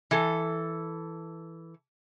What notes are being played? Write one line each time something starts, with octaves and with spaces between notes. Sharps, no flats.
E3 A4